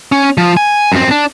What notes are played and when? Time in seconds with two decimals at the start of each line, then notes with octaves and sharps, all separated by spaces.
0.12 C#4
0.38 F3
0.57 G#5
0.92 F#2 C4
1.11 D4